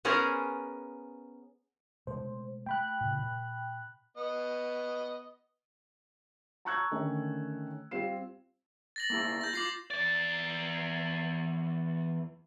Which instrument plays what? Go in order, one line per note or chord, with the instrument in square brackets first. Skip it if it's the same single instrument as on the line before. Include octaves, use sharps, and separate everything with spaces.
[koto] B3 C#4 G#4 A#4 C5
[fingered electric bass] B2 G#3 A3 [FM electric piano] C5
[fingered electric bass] A3 [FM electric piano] G5 B5 F#6
[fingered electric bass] A2 C#3
A#2
[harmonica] B3 D#5
[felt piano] A5 A#5 C#6 E6 F#6 G#6
D3 D#3 A3 C#4
G3 C4 F4 C7 E7
[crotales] A6 A#6 F#7
[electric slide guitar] A#3 E4 G#4
[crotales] G6 A#6
[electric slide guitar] F4 [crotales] D6 C7 F#7
[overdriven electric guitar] E2 D5